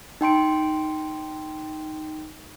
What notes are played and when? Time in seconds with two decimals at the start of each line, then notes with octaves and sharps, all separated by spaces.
0.21 D#4 G5 C6 D7